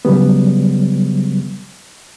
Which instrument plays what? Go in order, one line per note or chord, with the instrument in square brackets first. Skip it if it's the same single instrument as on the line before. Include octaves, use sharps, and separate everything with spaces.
[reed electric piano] C#3 F#3 G3 B3